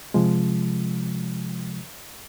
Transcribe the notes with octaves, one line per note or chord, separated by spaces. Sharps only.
C3 F3 G#3